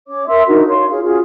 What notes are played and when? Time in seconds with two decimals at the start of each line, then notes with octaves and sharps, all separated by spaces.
0.08 C#4 C#5 D6
0.28 A#4 E5 C6 E6
0.47 D4 D#4 F#4 A#4
0.68 C#5 F5 C6
0.90 F4 G#4 C#5 F5
1.04 C#4 F4 F#4 G#4